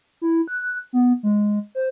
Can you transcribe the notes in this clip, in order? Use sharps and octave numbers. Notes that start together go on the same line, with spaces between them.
E4
F#6
B3
G#3
C5